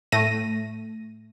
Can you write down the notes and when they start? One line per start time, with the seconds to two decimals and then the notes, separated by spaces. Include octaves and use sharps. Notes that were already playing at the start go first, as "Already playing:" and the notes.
0.12 A2 A3 A#6 D#7